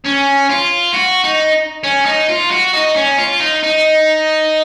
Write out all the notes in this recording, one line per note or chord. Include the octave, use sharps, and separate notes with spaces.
C#4
F4
F#4
D#4
C#4
D#4
F4
F#4
D#4
C#4
F4
D#4
D#4